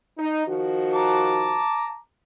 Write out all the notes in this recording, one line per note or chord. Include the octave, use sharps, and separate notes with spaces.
D#4
D#3 F3 F#4
A5 A#5 D6